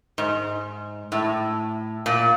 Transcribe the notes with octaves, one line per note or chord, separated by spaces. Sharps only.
G#2
A2
A#2